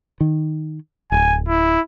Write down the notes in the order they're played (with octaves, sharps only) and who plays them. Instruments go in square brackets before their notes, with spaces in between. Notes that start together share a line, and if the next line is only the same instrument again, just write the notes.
[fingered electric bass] D#3
[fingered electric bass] D1 [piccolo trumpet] G#5
[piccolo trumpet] E4